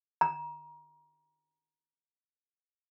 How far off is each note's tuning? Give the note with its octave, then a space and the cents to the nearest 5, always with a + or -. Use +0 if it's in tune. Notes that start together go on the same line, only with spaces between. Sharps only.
A#5 +25